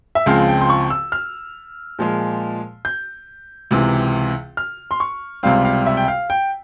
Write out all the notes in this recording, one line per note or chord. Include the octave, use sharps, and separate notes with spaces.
E5
C#2 C#3 F3 G#3 C4 F5
G5
C6
C#6
E6
F6
A#2 F3 G#3
G6
C#2 C3 E3
F6
C6
C#6
C#2 C3 G3 C4 F5
F5
E5
G5
F5
G5